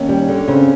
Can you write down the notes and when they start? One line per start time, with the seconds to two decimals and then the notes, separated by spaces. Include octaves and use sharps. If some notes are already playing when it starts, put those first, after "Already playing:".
Already playing: D#2 C#4
0.09 G3
0.29 D3
0.48 C#3 C4